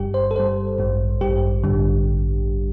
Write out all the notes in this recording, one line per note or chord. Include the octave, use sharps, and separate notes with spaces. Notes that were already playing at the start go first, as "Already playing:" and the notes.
Already playing: G1 G2 G3 G4
C5
A4
G1 G2 G3 C5
A1 G2 G3
A1 G2 G3 G4
A1 G2 D3 G3